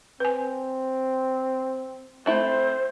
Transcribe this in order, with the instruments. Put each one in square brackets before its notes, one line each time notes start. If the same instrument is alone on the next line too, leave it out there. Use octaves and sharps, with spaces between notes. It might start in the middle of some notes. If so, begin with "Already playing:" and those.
[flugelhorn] C4 [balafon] B4 G#5
[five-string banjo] A3 E4 A5 [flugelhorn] C4 [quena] C5